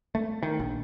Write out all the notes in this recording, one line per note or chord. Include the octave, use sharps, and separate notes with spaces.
A3
D#3
A#1